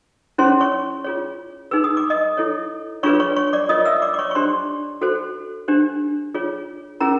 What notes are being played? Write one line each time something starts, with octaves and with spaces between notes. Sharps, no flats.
C#4 E4 G#4 C5 C#5 C6
C#5 C#6
F4 G#4 C#5
D#4 G#4 B4 E6
D#6
D6
D#5 D#6
E4 A4 C#5
D4 F4 G#4 B4 C#5 C#6
C#5 C#6
C#5 C#6
D5 D6
F4 A#4 C#5 D#5 D#6
E5 E6
D5 D6
D6
C#5 C#6
C#6
D4 G4 C5 C6
F#4 A4 C5
D4 G4 C5
F4 G#4 C#5
C#4 E4 G#4 A#4 A#5